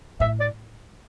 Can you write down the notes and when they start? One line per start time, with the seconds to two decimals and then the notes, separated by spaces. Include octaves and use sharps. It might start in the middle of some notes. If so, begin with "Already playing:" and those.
0.20 A2 E5
0.40 D5